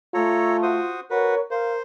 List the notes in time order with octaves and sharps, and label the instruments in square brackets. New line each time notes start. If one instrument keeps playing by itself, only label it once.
[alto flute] A3 [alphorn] F4 [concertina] A4 C#5 A#5
[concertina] F#4 C5 D#6
[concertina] F#4 B4 [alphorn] A#4 [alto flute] C#5
[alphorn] A#4 [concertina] C5 [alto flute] F5